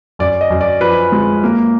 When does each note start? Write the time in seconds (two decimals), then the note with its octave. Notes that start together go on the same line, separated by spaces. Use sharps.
0.19 F#2 D5
0.41 D#5
0.50 F#2
0.61 D5
0.81 F3 B4
1.12 G#3
1.44 A#3